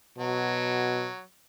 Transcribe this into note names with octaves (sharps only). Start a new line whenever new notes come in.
B2 F#3